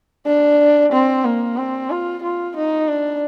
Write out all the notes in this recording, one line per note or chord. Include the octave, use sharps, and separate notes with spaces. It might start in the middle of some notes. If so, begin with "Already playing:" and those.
D4
C4
A#3
C4
F4
F4
D#4
D4